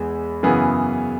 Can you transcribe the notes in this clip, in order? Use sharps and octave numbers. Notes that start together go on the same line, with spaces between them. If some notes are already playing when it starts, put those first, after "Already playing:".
Already playing: E2 G#3 B3
F#2 C#3 E3 B3 G#4